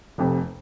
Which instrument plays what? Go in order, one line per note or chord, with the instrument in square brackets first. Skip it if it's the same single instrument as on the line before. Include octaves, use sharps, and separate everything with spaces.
[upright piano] F1 F2 C3